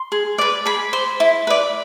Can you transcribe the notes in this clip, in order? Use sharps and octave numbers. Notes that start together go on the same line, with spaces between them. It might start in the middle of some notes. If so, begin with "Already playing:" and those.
Already playing: C6
G#4
B4 D5
G#4 B5
C5
E4
B4 D5